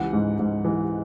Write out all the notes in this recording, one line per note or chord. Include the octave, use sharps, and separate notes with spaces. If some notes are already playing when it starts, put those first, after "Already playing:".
Already playing: C#2 E3 F#5
G#2
G#2
E3